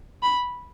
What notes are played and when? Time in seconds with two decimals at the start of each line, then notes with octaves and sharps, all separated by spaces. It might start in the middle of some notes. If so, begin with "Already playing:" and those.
0.23 B5